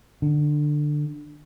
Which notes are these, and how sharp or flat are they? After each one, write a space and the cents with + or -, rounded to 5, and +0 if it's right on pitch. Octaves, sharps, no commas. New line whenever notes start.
D3 +15